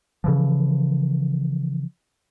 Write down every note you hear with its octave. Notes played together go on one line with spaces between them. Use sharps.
C#3 E3 F3